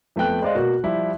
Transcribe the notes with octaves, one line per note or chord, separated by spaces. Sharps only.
F2 A3 B3 G5 F#6
G#3 C5 D5 D#5 F5
B2 A#3 F#4
F3 G3 E4